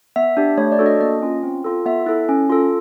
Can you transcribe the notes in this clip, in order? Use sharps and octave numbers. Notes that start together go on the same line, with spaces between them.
B3 E5
D4 G4
A3 C#5
D5
D4 F#4 A4
D#5
A#3 D#5
C#4 F4
C4
F4 A4
B3 E5
E4 A4
C#4
F4 A4